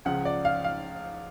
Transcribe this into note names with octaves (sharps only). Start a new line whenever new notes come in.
C#2 C#3 F3 F#5
D5
F5
F5